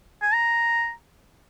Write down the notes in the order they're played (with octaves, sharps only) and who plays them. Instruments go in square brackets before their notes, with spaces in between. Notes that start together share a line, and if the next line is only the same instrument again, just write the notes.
[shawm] G#5
A#5